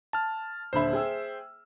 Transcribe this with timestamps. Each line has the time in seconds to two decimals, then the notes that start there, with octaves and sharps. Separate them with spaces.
0.13 A5 F6
0.73 D#1 D3 C5 E5 B5
0.93 G#4 G5 E6